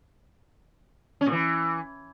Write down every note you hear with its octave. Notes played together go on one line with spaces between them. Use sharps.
C#4
A#2
E3